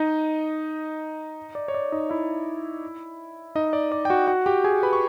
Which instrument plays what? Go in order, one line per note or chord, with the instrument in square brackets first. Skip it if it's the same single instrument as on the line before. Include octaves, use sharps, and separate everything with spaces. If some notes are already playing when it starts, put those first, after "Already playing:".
Already playing: [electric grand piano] D#4 D#5
D5
C#5
D5
D#4 D#5
E4 E5
D#4 D#5
D5
D5
G5
F#4 F#5
F#4 F#5
G4 G5
G#4 G#5
B4 B5
C#6